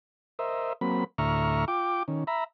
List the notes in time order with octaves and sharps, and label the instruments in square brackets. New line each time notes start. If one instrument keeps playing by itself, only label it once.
[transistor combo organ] A#4 C5 D#5 E5
F#3 A#3 C4 B5
D2 A2 E5 A#5 C#6 F6
F4 G5 D6
D#3 C#4
E5 A#5 B5